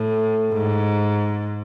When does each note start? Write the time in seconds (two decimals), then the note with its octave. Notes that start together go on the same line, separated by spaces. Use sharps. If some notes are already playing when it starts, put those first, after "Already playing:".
Already playing: A2
0.54 G#2